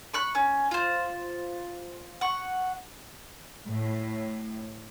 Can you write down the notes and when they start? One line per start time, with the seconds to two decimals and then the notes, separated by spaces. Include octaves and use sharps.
0.13 B5 C#6 F#6
0.35 C#4
0.71 F4 C5
2.21 F#5 C#6
3.69 A2